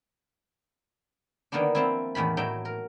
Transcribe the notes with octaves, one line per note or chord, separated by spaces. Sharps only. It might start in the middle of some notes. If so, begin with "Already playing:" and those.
D3 D#3 A#3 B3 D4
F3 C4 E4
E2 A2 D#3 B5
A2 F#3 D#4 E5 G5
A#4